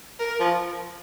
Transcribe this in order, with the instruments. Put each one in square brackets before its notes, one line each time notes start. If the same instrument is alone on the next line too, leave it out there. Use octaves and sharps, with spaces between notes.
[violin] A#4
[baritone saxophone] F3